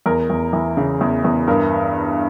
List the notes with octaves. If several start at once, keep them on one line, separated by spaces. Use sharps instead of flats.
E2 A#4
E2
E3
C#3
E2
E2
G2 A#4